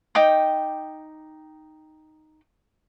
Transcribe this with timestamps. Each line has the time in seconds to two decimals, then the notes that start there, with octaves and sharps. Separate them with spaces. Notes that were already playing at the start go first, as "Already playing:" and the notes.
0.15 D#4 G5 D6 D#6